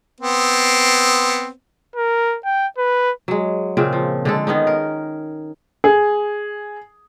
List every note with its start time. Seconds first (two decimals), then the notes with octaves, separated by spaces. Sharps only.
0.21 B3 C4
1.96 A#4
2.45 G5
2.78 B4
3.28 F#3 G#3
3.77 A#2 C#3 C4
3.93 F3
4.25 D3 G#3 A4
4.47 D#3 B3 C#4 D#4
4.67 A#4
5.84 G#4